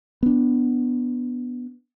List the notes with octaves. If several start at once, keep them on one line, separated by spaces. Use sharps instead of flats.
B3 D4